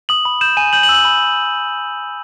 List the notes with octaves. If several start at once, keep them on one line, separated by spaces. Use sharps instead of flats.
D#6 F#7
B5
G6 E7
G#5 D#7
G6 F#7
F#7
E6
F#7
B5